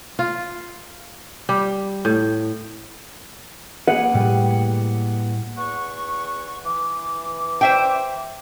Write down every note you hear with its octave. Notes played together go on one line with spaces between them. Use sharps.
F4
G3
A2
A#3 G#4 B4 F#5
A2 G3
E2 F#5 C#6
E3 D6
C5 E5 G5